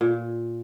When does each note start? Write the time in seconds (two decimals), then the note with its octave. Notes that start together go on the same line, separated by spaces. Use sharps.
0.01 A#2